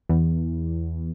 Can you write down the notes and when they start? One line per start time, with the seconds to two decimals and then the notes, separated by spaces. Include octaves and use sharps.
0.09 E2